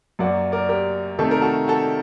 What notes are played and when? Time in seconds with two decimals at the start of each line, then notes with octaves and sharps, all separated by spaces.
0.19 F#2 F#3 A#3 D5 F#5
0.52 A#4 D5
0.69 G4 A#4
1.19 C3 D#3 A3 A4
1.31 A#4
1.42 F#4 A4
1.68 F#4 A4